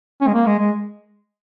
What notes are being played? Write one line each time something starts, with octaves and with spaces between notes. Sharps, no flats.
C#4
G#3
A#3
G#3
G#3